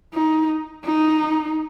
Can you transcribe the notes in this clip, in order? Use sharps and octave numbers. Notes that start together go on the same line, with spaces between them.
D#4
D#4